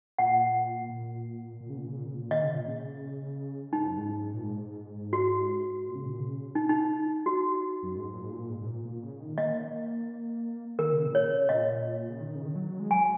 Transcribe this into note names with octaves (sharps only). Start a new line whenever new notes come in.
A#2 F#5
A#2
A#2
C#3
A#2
C#3
A#2
C#3
A#2
D#3 D#5
C#3
A#2
C#3
G#2 D#4
F#2
G#2
A#2
G#2
F#4
A#2
C#3
A#2
C#3
D#4
D#4
F#4
F#2
G#2
A#2
G#2
A#2
G#2
G#2
A#2
A#2
C#3
D#3
A#3 D#5
D#3 A#4
C#3
A#2
C#3 C#5
A#2 D#5
C#3
D#3
C#3
D#3
F#3
G#3
F#3 G#5